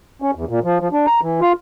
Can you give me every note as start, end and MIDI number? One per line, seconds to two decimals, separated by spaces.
0.22 0.31 61
0.35 0.45 40
0.49 0.59 46
0.64 0.78 53
0.80 0.88 53
0.93 1.06 62
1.06 1.20 82
1.22 1.40 52
1.41 1.53 65